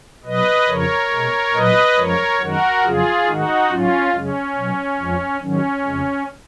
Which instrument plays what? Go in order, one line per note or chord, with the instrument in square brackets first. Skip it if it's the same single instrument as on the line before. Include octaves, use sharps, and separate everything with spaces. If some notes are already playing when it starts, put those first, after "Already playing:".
[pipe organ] B2 F#3 B4 D#5
F2 C#3 F3 A#4 C#5
B2 G#3
A#2 F#3 B4 D#5
F#2 F3 G#3 A#4 C#5
F#2 D#3 G#3 F#4 A#4
F2 C#3 F#3 F4 G#4
G#2 D#3 G#3 D#4 F#4
G#2 F#3 C#4 F4
F#2 C#3 G#3 C#4
B2 F#3
F2 F3 G#3
G#2 D#3 F#3 C#4
F2 C#3 G#3